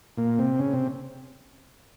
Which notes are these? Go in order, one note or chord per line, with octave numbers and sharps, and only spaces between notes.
A#2 A#3
C3 C4
C#3 C#4
C3 C4